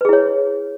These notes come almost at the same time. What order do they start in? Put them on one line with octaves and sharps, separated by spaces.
B4 G#4 E4 C#5